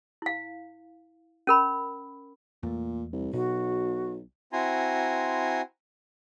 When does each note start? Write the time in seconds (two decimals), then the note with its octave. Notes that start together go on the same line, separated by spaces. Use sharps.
0.22 E4 F5
1.47 C#4 A#4 B5
2.63 E2 A#2 A3
3.12 C2
3.33 B1 B2 F#4
4.53 C4 E4 F#4 G#5 A#5 C6